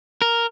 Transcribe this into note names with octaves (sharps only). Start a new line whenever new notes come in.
A#4